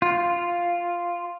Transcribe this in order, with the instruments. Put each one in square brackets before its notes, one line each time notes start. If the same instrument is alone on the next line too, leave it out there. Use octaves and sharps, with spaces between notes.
[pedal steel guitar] F4